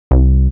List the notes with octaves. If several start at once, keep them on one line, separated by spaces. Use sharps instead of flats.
C2